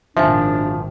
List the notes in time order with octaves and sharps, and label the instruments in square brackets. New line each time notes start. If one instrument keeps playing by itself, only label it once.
[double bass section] G#1 A#2 D#3 [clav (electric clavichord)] F3 [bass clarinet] D4 [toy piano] E5 F5 G#5